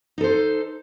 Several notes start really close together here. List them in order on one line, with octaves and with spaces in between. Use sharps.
D#4 A4 C5